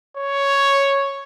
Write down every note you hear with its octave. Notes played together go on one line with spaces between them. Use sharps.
C#5